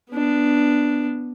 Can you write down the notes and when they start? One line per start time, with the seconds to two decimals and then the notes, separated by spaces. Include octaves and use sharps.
0.11 B3 D4